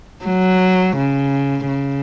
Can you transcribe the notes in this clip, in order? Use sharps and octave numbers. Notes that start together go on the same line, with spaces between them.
F#3
C#3
C#3